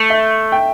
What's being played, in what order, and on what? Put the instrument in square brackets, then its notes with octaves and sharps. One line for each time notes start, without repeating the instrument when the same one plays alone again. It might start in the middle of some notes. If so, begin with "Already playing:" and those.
Already playing: [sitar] A3
[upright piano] E5
G5